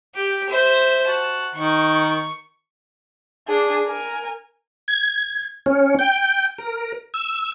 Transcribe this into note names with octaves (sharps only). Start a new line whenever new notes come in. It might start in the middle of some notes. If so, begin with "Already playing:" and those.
G4
C5 E5
F#4 A5
D#3 C#6
D4 G#4
A#4 G#5
G#6
C#4
G5
A#4
E6